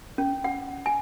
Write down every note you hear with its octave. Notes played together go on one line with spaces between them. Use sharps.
C#4
F#5
G#5